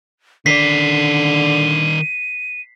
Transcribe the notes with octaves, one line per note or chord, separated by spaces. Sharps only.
D3 D#3 D5 B6 C7 D#7